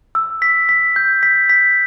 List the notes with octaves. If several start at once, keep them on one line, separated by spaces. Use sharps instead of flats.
E6
B6
B6
G6
B6
B6